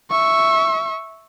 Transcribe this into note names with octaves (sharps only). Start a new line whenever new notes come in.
E5 C#6